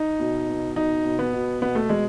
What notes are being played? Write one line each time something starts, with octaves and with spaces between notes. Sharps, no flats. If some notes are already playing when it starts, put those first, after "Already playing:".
Already playing: D#4
B2
B2
B2 D#4
B2
B3
B2
B2 B3
A3
B2 G#3